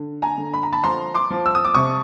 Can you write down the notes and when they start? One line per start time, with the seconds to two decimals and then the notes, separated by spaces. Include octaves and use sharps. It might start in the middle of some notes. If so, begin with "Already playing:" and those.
Already playing: D3
0.22 G#5 A#5
0.38 D3
0.54 B5
0.63 A#5
0.72 A5 B5
0.84 F3 A#5 C6
1.14 C6 D6
1.30 F3
1.46 E6
1.55 D#6
1.65 D6
1.74 C3 C#6 D#6